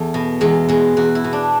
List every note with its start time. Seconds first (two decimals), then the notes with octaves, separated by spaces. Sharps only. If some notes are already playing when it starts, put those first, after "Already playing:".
Already playing: E2 A3
0.14 B2
0.41 E2 G#3
0.68 B2 G#3
0.97 E2 F#4
1.15 E4
1.24 B2
1.33 D4